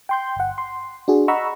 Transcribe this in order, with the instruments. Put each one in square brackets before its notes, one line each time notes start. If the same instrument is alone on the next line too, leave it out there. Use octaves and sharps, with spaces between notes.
[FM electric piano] G5 C6 G6
G1 F#5
C6
D4 F#4 G#4
D#5 F#5 A#5 B5 C#6 E6